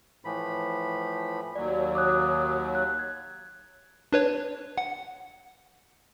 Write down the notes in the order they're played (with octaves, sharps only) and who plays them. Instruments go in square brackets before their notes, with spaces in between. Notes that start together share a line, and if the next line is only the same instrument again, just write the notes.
[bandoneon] A2 E3 F3 B5
[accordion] D#2 F#3 [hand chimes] D5
[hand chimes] D6 D#6 F#6
F#6
G#6
[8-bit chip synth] D4 B4 C#5
F#5